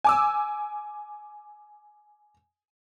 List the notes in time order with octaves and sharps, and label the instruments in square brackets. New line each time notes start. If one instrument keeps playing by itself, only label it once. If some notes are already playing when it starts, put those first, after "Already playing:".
[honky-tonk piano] G#5 D6 E6